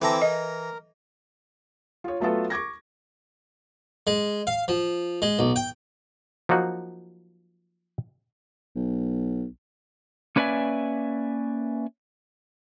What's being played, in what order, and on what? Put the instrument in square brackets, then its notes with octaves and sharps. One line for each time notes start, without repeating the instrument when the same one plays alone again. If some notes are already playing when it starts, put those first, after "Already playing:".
[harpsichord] E3 G5 A#5 [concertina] C4 E4 D6 [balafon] A4 A5
[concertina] A#4 [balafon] D#5
[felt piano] F4 C#5
F#3 A3 B3 F4 A4
C#6 D6 G#6 A#6
[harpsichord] G#3
F5
F3
G#3
B1
G5
[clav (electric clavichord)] F3 F#3 A#3 D#4 F#4
[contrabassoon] B1
[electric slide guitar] A#3 C#4 B4 D5 E5 G#5